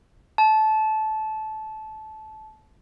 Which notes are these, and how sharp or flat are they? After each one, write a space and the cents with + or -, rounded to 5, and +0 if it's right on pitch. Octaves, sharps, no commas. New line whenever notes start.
A5 -20